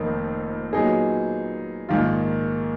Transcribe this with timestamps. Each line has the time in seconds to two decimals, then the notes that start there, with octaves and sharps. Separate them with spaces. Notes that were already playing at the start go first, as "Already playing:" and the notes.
Already playing: F1 F2 D#3 A#3 D#4
0.73 A#2 F#3 B3 D#4 G#4
1.89 A#1 G#2 D#3 A#3 F4